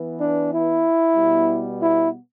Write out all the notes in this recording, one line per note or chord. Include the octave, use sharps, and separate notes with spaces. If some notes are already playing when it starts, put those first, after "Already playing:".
Already playing: E3 B3
D4
E4
B2 G3 B3
E4